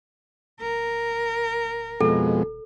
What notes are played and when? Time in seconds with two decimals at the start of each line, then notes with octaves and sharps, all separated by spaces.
0.61 D1 A#4
2.01 D#1 F2 B2 G#3 A4